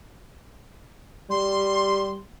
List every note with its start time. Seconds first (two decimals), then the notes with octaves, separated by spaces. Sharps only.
1.30 G3 C6